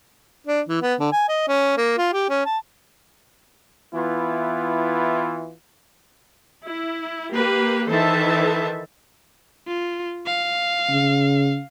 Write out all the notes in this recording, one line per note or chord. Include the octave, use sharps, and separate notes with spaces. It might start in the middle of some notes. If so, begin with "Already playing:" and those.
D4
E3
B3
D3
G#5
D#5
C#4
A#3
F4
G4
C#4
A5
E3 B3 E4 F4
E4
A#3 G4 B4
D#3 E3 A4 C5 E5 A5
F4
F5
C#3